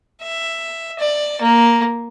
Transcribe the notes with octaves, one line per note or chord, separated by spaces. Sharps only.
E5
D5
A#3